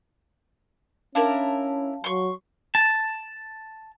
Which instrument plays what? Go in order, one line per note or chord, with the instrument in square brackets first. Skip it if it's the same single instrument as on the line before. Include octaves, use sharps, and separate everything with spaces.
[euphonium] C#4 [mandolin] D4 E4 A#4 [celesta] F5 A5
[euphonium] F#3 [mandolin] C6 C#6
[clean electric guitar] A5